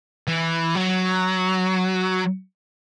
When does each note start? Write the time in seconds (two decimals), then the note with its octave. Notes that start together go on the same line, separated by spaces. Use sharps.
0.28 E3
0.75 F#3